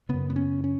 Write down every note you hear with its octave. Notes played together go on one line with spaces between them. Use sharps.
F#2 C#3 B3
B3
C#4
C#4